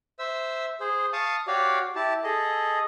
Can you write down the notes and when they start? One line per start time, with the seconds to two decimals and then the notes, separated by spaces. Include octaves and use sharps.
0.19 C5 E5 E6
0.80 G#4 C5
1.13 F5 A5 C#6 D#6
1.47 F#4 G4 C#5 D5 F5
1.96 E4 G4 A5
2.24 G#4 A4 D#5